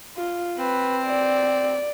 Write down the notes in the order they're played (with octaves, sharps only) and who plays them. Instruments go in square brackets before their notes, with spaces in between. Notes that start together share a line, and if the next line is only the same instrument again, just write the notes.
[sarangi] F4
[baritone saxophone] C4 [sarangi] B4
[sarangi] D5